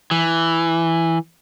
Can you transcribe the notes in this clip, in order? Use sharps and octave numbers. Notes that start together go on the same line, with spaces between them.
E3